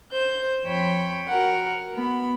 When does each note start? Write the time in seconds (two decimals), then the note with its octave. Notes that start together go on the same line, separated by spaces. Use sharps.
0.13 C5 G6
0.65 F2 C#5 G5 B5 C6
1.29 F#4 A#4 F#5
1.95 B3 B5